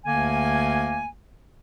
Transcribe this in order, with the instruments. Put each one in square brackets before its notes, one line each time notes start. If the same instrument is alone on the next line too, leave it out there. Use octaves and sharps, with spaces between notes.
[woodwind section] D2 D3 A#3 G#5